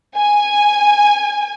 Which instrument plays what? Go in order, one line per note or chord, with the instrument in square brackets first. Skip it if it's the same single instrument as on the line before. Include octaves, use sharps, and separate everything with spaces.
[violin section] G#5